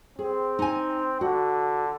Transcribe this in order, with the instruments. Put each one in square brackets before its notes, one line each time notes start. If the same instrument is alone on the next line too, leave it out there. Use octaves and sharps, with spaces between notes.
[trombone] C4 [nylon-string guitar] G#4
[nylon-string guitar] D#4 G#5
[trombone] D3 [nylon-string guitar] F#4